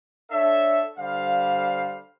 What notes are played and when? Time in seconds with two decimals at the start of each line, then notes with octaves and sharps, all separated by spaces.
0.31 D4 A4 C#5 E5
0.98 D3 G3 C5 F5